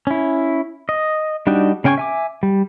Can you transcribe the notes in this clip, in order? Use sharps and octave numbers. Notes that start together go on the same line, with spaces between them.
C#4 E4
D#5
G3 D4 D#4 F#4 G5
C#3 C#4 G5 G#5 C#6
E5 G#5 D6
G3